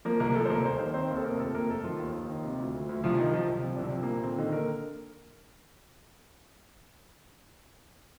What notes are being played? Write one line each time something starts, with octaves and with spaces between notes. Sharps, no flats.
F3 A#3 A#4
C2 A#3 A#4
F3 A3 A4
C5
C2 A#3 A#4
D#2 C5
D#3 C5
D#3 C4 C5
D#2
A4
C3 A#3 A#4
F2 A3 A4
C3 A#3 A#4
F2 A3 A4
D#3 F3 F4
D#2
D#2
D#3
C3
D2
D2
D2
C2 F3 F4
D#3 F3 D#4
F3 F4
C2
F3 C4
D4
C2 C4
F3
A#3
A#2
D3 C4
D3 D#3 D#4
D3 A#3 A#4